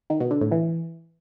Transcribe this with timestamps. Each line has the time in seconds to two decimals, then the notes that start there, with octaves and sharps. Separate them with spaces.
0.10 D#3
0.20 B2
0.31 D3
0.41 A2
0.51 E3